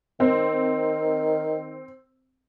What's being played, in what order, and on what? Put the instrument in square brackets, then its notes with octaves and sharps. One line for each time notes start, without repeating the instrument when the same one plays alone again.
[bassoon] D#3 [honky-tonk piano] C4